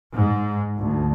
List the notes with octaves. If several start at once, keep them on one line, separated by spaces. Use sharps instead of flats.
G#2
D2